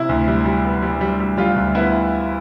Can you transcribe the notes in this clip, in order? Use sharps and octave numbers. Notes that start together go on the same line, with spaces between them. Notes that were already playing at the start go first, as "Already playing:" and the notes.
Already playing: C3 E4 E5
D2
G3
G3
B3
G3
G3
G3
G3 F4 F5
D2
B3 E4 E5